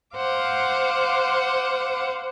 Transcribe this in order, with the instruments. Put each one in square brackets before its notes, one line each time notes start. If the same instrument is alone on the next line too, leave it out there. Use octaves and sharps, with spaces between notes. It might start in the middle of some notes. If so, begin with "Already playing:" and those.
[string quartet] C5 F5 F#5 D6